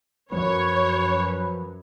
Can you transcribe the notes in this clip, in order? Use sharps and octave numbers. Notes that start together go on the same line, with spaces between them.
F#2 F3 B4 C#5